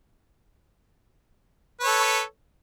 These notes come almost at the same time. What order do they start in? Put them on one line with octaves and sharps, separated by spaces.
B4 C#5 A4